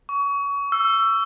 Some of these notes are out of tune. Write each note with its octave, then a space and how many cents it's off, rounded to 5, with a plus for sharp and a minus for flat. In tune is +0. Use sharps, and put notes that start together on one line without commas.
C#6 +30
E6 +20